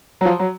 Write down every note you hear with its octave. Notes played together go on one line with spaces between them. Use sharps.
F#3
F3
F#3